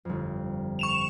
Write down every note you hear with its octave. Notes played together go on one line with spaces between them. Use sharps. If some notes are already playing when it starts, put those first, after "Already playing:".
G1 F2
C#6 E7 F7